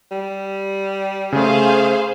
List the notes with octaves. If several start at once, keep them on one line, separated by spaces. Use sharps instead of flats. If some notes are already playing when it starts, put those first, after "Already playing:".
G3
C#3 A3 G#4 C5 F5